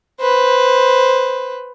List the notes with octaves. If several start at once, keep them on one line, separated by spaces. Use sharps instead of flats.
B4 C5